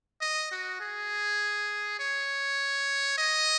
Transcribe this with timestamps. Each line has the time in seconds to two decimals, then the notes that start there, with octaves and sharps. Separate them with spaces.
0.21 D#5
0.52 F#4
0.80 G#4
2.00 C#5
3.18 D#5